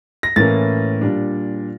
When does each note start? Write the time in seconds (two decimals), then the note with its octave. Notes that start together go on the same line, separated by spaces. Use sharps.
0.23 A#6
0.36 A2 E3 A#3 C#4 A6
1.01 A#2 G3 D4